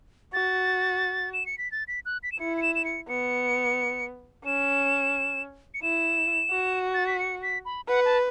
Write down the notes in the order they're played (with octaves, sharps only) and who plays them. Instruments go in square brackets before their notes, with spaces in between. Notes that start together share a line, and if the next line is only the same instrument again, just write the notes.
[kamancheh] F#4 [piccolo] A6
[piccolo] E7
C#7
B6
A6
B6
F#6
B6
E7
[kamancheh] E4 [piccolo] C#7
[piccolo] C#7
E7
E7
C#7
[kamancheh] B3 [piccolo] C#7
[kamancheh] C#4 [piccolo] E7
[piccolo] C#7
[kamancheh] E4 [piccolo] E7
[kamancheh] F#4
[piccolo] A6
B6
C#7
B6
B5
[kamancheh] B4 [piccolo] F#5
[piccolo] A5